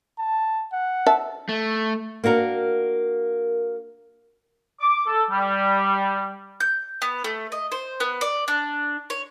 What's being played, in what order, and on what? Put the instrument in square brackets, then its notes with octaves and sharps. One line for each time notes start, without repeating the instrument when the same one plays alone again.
[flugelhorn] A5
F#5
[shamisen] E5 A5
[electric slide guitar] A3
[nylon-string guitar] A#3 D4 F#4 A#4
[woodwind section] D6
A4
G3
[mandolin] G6
B3
A3
D#5
C5
B3
D5
D4
C#5